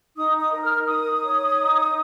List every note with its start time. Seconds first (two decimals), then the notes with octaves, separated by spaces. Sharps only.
0.16 D#4 D#6
0.40 D#6
0.52 A#4
0.63 F6
0.87 D#4 D#6
1.23 C#5
1.58 D#4